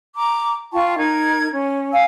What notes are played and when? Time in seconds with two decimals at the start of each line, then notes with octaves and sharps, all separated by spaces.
0.15 A#5 D6
0.73 F4 G5 A5 C#6
0.97 D#4 A#4 G#6
1.51 C#4
1.92 F5 G#5 E6